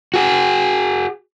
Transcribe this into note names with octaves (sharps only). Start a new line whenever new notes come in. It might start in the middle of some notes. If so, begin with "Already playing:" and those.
F#4 G#4